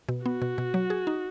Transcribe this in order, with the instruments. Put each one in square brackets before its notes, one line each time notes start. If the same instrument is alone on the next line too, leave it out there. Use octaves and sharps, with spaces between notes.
[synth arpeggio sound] B2
[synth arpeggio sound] B3 [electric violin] F#4
[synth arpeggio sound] B2
B2
F#3
G#4
D#4